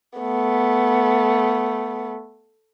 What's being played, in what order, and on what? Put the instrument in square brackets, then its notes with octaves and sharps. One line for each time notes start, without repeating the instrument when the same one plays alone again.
[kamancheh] A3 B3